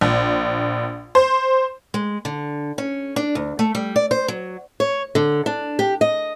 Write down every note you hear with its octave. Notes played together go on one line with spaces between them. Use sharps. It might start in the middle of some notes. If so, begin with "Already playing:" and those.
A#1
C5
G#3
D3
C#4
D4
D2
A3
G3
D5
C5
F#3
C#5
D3
D4
G4
D#5